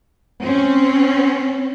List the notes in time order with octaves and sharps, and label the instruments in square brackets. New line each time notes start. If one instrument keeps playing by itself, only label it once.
[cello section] C4 C#4